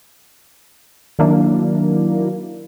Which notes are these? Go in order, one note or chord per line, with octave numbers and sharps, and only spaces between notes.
D#3 F#3 A#3 D4 E4